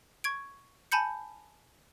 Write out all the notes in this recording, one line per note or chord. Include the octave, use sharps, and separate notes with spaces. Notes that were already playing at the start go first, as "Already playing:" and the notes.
C#6 G#6 D7
G#5 A5 B5 G6 C#7